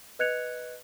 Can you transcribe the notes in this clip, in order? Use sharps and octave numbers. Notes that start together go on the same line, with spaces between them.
B4 D#5 F#6 G#6 C#7 F7